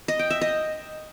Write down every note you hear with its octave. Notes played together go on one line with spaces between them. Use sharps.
D#5
G5
E5
D#5